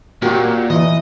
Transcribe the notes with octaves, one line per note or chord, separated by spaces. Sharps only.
A#2 A#3 F#4 G4
E3 D#5